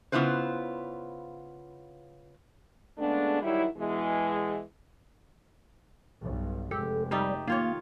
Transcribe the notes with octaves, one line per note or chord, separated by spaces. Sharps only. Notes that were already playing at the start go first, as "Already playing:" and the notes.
C#3 B3 E4 F4 B4 C5
C#3 G#3 A3 B3 D4
D#3 F#3 G3 E4
B2 E3 G#3
B1 G2
F1 G#3 G4 A4
G3 A3 D#4 G4
D#3 A#3 F4 C#5